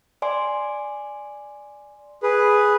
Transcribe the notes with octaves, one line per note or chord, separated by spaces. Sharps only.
D5 G#5 C6
G#4 B4